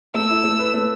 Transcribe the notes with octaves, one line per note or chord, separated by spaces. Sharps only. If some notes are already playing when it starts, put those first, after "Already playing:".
A3 E6
E4
A3
B4
A3